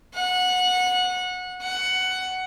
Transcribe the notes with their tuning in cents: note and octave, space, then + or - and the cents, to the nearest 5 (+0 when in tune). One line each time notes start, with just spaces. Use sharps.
F#5 -20
F#5 +10